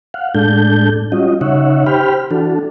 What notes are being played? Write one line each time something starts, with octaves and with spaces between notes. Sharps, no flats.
F5 F#5
A2 G#3 D4 A4 G6
G3 C#4 F4 F#4 D#5
C#3 D#4 C#5 E5 F#5
G4 C5 G5 B5 F6
E3 D4 F#4 A4